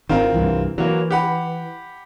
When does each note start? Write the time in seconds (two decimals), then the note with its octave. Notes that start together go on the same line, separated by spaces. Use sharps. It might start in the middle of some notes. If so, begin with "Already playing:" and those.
0.09 G#1 D#3 C4 F4 A#4
0.34 C2 G2 E3
0.78 E3 F#3 A#3
1.11 G4 F#5 B5